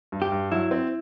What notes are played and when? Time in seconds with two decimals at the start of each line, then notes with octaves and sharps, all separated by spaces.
0.12 G2
0.22 G4
0.32 G2
0.52 F#3 E4
0.71 C4